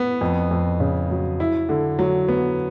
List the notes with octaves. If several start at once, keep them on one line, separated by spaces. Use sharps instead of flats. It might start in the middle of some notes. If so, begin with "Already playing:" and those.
Already playing: B3
F2
F2
C#3
F#3
E4
D3
F#3
B3